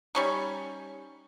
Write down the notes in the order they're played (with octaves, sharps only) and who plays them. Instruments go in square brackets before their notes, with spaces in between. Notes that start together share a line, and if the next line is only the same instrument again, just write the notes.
[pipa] G3 C#4 D#4